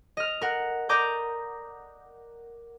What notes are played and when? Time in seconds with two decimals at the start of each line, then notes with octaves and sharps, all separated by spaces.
0.17 D#5 F6
0.41 A#4 F#5
0.89 A#4 D5 A#5 D6 D#6 G6